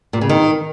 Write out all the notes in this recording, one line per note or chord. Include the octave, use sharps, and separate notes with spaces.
A#2
C#3
D#3